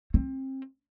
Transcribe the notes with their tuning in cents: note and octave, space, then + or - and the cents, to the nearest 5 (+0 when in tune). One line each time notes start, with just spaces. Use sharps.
C4 +30